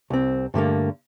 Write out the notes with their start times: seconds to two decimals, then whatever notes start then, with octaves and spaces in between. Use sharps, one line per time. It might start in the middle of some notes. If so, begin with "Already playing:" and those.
0.10 C2 C4
0.54 G2 D3 A3 A#3